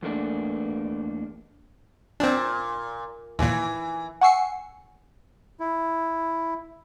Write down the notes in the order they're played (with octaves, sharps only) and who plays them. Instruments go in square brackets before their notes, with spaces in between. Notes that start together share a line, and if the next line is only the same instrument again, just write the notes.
[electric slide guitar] E2 A3 A#3 D4
[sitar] A#2 [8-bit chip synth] C4 D4
[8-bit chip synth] D#2 A#2 [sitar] E3
[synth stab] F#5 G#5 C#6 E6 C7 C#7
[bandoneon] E4